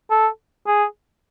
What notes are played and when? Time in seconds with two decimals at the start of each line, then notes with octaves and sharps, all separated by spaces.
0.11 A4
0.67 G#4